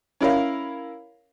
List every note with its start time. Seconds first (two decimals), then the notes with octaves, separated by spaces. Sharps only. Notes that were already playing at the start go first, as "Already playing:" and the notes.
0.21 C#4 E4 A#4 F5